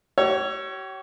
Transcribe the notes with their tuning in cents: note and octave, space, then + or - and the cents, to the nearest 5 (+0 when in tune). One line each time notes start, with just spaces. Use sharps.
G4 -45 C#5 +0 E6 +35